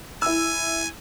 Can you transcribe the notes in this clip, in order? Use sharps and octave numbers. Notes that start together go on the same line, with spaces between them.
E4 G#5 E6